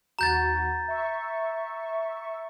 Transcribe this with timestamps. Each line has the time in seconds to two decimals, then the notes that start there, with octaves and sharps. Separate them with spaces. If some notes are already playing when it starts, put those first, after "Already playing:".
0.19 D#2 F#4 A#5 G6 A6
0.88 E5 C#6